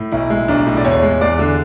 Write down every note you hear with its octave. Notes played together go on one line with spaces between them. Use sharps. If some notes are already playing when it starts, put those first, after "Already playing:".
Already playing: A2
B1 E4
G#3
B1 D4
A2
D5
E2 C#5
G#3
E2 D5
D3